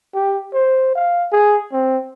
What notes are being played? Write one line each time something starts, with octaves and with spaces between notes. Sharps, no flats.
G4
C5
F5
G#4
C4